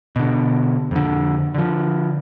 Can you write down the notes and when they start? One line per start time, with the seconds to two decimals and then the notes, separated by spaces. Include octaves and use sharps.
0.16 B2 D3
0.91 F2 D3
1.55 D3 F3